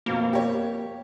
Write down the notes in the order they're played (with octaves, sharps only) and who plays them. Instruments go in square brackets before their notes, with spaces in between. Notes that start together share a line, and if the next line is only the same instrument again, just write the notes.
[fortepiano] F2 B2 [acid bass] A#3
[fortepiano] G4 C#5